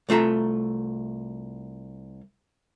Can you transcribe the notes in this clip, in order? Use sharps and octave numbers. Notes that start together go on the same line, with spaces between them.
C2 A3 F4 E5 A#5